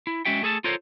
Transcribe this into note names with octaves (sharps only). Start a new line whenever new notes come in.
E4
G#3 C#4 F#4 E5 G5
A3 G#4 A4 A5
F4 A4 A#4 C5 C#5